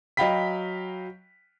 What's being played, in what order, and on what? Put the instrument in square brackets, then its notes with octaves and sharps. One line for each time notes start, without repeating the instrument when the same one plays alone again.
[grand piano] F#3 D#5 F5 G5 B5 B6